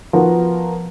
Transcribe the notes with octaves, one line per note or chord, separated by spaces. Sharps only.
F3 B3 F#4 A#4